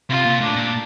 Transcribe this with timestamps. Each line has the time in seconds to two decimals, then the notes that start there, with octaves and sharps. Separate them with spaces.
0.10 C3 F4
0.25 A#2
0.40 A2 D4
0.56 A#2